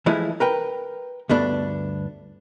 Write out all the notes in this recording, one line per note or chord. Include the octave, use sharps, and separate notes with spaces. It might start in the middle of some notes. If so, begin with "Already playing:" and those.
E3 F3 G#3 A3 E4
A#4 B4 G5
D2 G2 B3 D4 A4